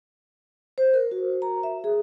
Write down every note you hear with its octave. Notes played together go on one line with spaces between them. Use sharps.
C5
A#4
F#4
A#5
E5
G#4